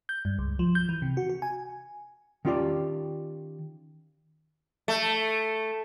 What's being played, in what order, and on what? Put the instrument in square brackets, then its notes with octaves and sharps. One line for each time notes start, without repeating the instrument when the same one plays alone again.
[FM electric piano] G6
G2
C#2
F3
G6
E3
C3
F#4
F#4
G#5
[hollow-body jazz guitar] D#3 C#4 F4 G4 D5
[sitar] A3